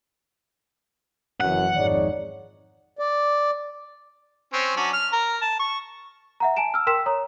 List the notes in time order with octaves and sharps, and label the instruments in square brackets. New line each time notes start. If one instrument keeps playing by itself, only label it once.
[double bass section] F#1 E3 [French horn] F#2 [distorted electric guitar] F#5
[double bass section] G#1 F2 [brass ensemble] D#4 G#4 C#5 [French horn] D5
[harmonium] D5
[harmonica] C4 C#4
F#3 C#4 D4
F6
A#4
A5
C#6
[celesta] E5 F#5 A#5
G#5 A5 D7 E7
E6 F6
A#4 G5 C6 E6 B6 E7
C#5 A#5 D#6